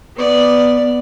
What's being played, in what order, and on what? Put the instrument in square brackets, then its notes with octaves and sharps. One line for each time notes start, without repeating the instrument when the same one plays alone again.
[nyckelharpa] B3 D5